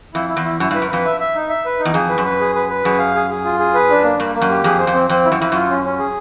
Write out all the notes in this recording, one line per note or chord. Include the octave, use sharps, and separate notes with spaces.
F2 E4
E4
E2
E4
F#2 E4
G2 B4
F#2
F2 B4
E5
E5
D#4
E5
B4
D#4
E2
F2 G#4
B4
F#2
B4
G#4
B4
B4
F#2 G#4
F5
G#4
G#4
F4
G#4
B4
D4
A#3
G2 A#3
A#3
F#2
G4
F2 G#4
C5
F2
C4
F2 C4
E4
F#2
F2 E4
F#2 F4
C#4
C#4
G#4